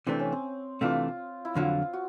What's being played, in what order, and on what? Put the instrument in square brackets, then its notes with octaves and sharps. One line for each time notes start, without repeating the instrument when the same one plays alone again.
[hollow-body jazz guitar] C3 E3 A3 D4 [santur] C4
[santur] C#4
C4
[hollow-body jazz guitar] C3 E3 A3 D4 [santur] F4
[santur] E4
[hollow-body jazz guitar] F2 D3 F#3 [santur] F4
[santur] F#4